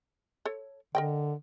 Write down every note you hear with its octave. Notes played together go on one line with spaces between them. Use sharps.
A4 C#5
D3 A#4 D#5 G5